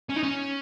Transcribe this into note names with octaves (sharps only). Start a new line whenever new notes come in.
C#4
D#4
C#4